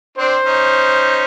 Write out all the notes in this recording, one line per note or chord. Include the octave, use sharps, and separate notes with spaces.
C4 D4 C5
C#4 D#4